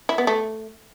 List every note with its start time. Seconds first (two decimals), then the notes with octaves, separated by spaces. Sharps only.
0.09 E4
0.18 B3
0.27 A3